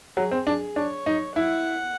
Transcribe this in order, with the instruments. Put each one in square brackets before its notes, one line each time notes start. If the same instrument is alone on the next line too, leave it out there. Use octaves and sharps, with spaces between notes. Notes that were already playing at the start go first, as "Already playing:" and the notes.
[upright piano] F#3 [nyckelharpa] G#4
[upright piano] C4
[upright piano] D4 [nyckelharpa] G#4
[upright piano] D4 [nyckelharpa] C#5
[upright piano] D#4
[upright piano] E4 [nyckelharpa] F#5